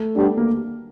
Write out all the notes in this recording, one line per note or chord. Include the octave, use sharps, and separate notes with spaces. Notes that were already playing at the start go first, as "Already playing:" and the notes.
Already playing: A3
G3 B3 D4 G4
A#3